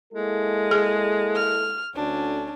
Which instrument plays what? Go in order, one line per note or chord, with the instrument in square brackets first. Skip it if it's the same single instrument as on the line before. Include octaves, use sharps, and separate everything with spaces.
[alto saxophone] G#3 [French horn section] A#3 E4 A4
[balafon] G#4
[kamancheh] F6
[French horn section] D2 [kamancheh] C#4 D4